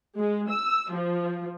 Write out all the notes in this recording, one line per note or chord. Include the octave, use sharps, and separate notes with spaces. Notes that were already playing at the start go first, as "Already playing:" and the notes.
G#3
E6
F3